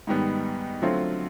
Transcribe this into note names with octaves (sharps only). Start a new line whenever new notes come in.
G#2 D#3 G3 B3
D3 F#3 A3 C4 F4